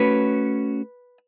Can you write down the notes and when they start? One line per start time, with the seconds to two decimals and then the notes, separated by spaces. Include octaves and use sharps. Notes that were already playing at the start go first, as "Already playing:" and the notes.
Already playing: A3 C#4 F#4 B4 C#5